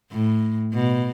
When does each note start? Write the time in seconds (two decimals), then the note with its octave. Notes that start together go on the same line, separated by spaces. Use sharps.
0.12 A2
0.74 B2